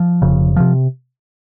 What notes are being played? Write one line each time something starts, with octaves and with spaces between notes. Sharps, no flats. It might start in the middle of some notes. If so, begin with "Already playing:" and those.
Already playing: F3
F1 F2 C#3
C3 F3